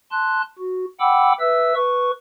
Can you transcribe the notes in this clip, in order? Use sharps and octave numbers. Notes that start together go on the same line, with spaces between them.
A5 C6 F#6
F#4
F#5 G5 B5 D6 E6
B4 E5 E6
B4 C#6